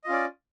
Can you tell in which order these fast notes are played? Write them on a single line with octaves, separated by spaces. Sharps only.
D#5 F4 C#4 D5